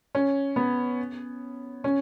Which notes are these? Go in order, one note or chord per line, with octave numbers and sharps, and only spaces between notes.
C#4
B3
C#4